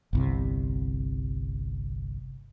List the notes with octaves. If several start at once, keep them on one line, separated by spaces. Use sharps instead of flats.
G1 C2 C3